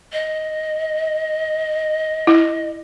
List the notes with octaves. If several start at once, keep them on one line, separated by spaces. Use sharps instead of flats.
D#5
E4